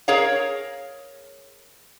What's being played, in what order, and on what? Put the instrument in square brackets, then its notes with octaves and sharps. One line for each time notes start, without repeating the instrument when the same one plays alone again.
[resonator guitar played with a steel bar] G#4 A#4 C#5 F5